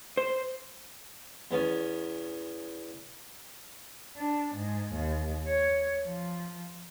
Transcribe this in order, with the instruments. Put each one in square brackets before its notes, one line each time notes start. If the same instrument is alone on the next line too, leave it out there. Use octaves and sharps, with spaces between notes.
[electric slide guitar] C5
[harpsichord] E2 B3 C#4
[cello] D4
G#2
D#2
C#5
F3